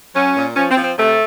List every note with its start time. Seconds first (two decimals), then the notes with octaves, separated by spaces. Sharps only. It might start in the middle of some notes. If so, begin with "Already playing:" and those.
0.15 F#3 C#4
0.36 A#2
0.56 F3 C#4
0.71 C4
0.77 F3
0.84 C4
0.98 C3 A3